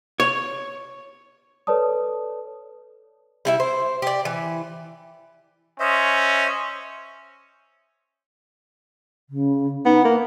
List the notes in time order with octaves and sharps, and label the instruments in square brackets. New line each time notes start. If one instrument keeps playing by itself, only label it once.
[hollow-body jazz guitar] C#5
[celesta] A4 B4 C#5 D5 A5 D#6
[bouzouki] G3 E4 E5
C5
G4 D5
E3
[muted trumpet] C#4 [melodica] C5 D#5 E5
[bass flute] C#3
[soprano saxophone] B3 [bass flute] D#4
[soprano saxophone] A#3 [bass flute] A#4